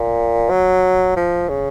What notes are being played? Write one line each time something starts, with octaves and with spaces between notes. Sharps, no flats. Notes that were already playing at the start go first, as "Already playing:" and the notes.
Already playing: A#2
F#3
F3
C#3